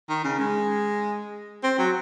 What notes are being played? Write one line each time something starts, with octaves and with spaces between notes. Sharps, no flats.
D#3
C#3
G#3
C4
F#3